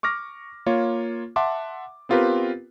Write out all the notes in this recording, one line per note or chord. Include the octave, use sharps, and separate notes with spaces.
C#6 D6 F6 A#6
A#3 F4 C#5
E5 F#5 A5 C6 D6
B3 C4 F4 G4 A#4 B4